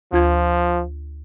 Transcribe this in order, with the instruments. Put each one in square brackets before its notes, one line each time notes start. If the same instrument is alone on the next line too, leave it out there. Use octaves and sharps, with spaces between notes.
[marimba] D2 F4 G#6 [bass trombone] F3